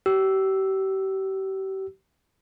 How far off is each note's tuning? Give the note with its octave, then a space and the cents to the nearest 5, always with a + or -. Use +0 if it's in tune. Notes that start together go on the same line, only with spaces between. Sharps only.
G4 -35 E6 +0